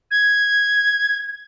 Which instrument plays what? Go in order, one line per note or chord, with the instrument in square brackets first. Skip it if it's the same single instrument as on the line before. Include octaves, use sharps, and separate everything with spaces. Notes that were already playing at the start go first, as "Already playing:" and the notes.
[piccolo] G#6